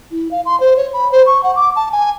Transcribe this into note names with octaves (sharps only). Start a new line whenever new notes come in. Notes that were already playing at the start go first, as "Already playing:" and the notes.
E4
F5
C6
C5
C#5
B5
C5
C#6
F#5
D6
A5
G#5